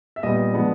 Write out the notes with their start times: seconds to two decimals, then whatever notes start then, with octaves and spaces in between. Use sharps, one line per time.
0.16 E5
0.23 A#2 G3 B3 D#5
0.53 F3 G#3 B3 D4